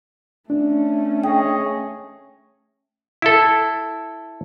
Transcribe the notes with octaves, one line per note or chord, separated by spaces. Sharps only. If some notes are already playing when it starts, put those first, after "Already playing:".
A3 C#4 D4
G#4 C#5 D#5 G5
E4 A4